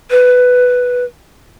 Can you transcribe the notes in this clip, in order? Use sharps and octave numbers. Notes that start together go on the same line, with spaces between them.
B4